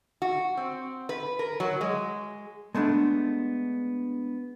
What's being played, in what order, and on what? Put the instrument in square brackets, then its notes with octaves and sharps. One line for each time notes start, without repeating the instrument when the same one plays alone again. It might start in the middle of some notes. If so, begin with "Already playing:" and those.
[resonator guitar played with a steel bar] F#4
C4
B4
A#4
F#3
G#3
[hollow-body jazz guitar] G#3 A3 B3 D4